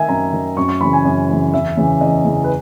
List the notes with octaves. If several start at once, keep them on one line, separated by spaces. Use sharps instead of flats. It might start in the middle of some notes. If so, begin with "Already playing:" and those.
Already playing: D#3 D#5 E5 G#5
F#2 A#5
D#3
F#2 C#6
C#6
C#3 E3 B5
G#5
F#2
C#3 E3
E2 E5
C#3 E3
E2 D#5
C#3 E3
B4